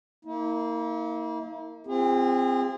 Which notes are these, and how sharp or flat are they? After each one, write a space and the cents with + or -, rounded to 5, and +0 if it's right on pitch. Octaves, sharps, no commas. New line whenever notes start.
A#3 -15 E4 -45
C4 +0 F4 -20 G#4 -35